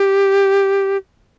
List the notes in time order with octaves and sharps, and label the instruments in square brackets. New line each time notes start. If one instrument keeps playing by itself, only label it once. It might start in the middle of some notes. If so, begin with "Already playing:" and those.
Already playing: [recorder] G4